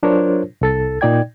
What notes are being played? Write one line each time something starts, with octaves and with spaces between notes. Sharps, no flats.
F#3 D4 F4 A#4 C5 C#5
C2 A4 A6
A#2 D#4 D5 G5 G#6